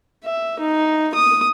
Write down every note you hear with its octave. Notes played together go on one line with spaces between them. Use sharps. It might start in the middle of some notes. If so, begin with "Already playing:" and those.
E5
D#4
D#6